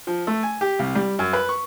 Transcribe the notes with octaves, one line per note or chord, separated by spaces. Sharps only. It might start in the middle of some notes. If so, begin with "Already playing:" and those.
F3
A3
G#5
G4
C2
G3
F#2
B4
C#6